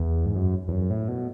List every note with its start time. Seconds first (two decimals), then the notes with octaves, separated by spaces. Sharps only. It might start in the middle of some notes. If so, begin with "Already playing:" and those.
Already playing: E2
0.26 G#2
0.35 F#2
0.68 E2
0.72 F#2
0.90 A2
1.08 B2